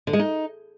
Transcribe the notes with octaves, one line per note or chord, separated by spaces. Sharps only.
D3
G#3
D#4